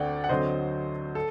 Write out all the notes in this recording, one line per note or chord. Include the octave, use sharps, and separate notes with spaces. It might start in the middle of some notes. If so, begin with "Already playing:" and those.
Already playing: D2 D3 A3 D5 F#5 G5
F#5
D2 D3 F#3 C4 C5 D#5
A4